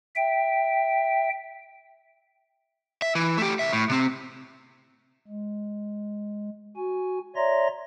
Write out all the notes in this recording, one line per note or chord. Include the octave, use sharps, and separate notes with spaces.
E5 G5
E5
E3
A3 G4
C2 E5
A2
C3 C4
G#3
F#4 G#5
C#5 D5 E5 A#5 C6 A#6